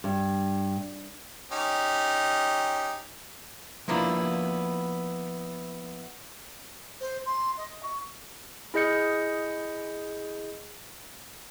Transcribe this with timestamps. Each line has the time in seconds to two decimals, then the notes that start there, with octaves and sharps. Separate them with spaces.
0.04 G2
1.52 C#4 D#4 G4
3.88 F3 A#3 B3 D4 E4 F4
7.00 C5
7.26 C6
7.57 D#5
7.83 C#6
8.74 E4 G#4 D#5 G6 C#7